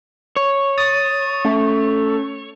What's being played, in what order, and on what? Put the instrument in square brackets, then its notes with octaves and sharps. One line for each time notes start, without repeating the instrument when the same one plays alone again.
[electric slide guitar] C#5
[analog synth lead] D#6 [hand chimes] A6
[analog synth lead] A3 [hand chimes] C#4